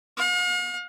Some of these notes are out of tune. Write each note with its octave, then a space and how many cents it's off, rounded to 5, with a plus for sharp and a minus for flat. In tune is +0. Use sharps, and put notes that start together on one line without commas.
F5 +45